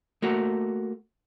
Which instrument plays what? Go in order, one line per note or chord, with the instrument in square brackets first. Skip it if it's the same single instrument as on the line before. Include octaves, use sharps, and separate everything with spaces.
[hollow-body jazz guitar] A3 A#3 F#4